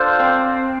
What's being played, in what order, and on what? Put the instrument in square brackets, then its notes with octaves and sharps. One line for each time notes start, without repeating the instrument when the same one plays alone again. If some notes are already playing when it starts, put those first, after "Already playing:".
Already playing: [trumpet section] D4 F4 A4 C5 F5
[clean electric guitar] C4